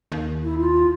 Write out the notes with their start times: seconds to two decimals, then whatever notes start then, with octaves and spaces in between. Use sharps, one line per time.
0.12 D#2
0.43 E4
0.58 F4